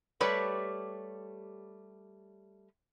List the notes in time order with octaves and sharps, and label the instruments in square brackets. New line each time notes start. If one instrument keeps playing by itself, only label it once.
[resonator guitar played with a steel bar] G3 A3 G4 B4 C#5 D5